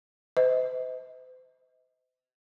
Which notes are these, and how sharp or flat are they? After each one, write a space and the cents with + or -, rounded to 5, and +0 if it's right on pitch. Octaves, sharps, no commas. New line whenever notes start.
C5 -40 D#5 +35